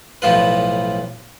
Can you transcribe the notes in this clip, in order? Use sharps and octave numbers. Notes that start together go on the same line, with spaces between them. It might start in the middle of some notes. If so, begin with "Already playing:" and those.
B1 A2 F3 F4 B4